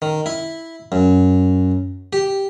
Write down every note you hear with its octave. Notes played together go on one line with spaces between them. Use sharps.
D#3
E4
F#2
G4